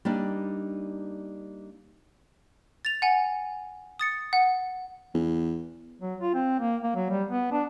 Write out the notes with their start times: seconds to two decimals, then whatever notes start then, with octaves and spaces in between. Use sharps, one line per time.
0.05 G3 A#3 D4 D#4
2.85 A6 F7
3.02 F#5 G#5
3.99 D#6 A6 C#7
4.33 F#5
5.14 E2
6.01 F#3
6.21 F4
6.34 C4
6.59 A#3
6.83 A#3
6.96 F#3
7.10 G3
7.28 B3
7.51 D4